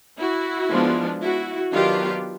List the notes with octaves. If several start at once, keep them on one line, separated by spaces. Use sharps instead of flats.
E4 F#4
F3 G#3 B3 D4
E4 F#4
D#3 F#3 B3 D4 F4 G4